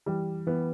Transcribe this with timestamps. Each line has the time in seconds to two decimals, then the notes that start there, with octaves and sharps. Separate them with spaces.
0.06 E3 G3
0.47 E3 B3